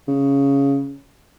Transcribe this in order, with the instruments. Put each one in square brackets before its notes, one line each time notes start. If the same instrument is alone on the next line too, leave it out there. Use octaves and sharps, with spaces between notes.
[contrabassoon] C#3